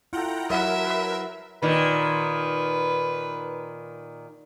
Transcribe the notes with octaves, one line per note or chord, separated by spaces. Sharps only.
E4 F4 A4 F#5 G5 A#5
F#3 E4 A#4 E5 F#5
B4 C6
A#2 D#3 B4